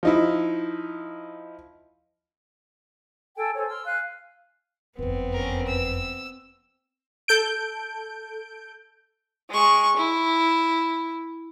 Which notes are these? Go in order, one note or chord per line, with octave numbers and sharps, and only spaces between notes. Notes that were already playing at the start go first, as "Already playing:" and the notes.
F3 D#4 E4
A4 G5 G#5
A4 C5 C#5 G#5
C6 E6 F6
F5 G#5 F#6
F#1 F2 B3 C4 B4
C#4 A#4
E6
A4 G6 D7
G#3 C#6
E4